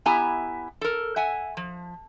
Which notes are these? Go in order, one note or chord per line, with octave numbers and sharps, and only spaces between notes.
B3 E4 G4 G#5 A#5
A4 A#4
E5 F#5 G#5
F3